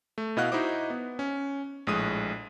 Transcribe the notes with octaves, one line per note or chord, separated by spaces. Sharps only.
A3
B2 E4 D#5 F5 F#5 F#6
D#4 E4 F#4 C5 D#5 D6
B3
C#4
A#1 A2 G#3 D#6 D#7